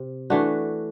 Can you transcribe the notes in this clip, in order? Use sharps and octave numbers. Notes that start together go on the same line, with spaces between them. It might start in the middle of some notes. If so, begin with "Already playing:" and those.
Already playing: C3
E3 A3 D4 F#4